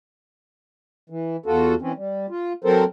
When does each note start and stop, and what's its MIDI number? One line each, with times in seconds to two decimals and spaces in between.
1.10 1.36 52
1.46 1.75 40
1.46 1.75 65
1.46 1.75 66
1.46 1.75 69
1.82 1.92 52
1.82 1.92 60
1.82 1.92 61
1.97 2.26 55
2.30 2.53 65
2.64 2.84 54
2.64 2.84 60
2.64 2.84 69
2.64 2.84 70
2.64 2.84 72